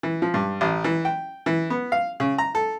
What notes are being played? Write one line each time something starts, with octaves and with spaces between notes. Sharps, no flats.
E3
F3
G2
A1
E3
G5
E3
B3
F5
C#3
A#5
A4